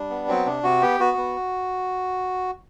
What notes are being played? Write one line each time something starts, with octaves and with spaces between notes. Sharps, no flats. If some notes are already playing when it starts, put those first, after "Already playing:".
Already playing: G3 D4
B3
F#3 C4
C3 D4
C3 F#4
B3 G4
B3 F#4
B3